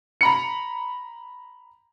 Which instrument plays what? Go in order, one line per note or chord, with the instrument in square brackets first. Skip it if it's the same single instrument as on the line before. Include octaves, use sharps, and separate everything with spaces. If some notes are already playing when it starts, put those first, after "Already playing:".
[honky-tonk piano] A#5 B5 C#7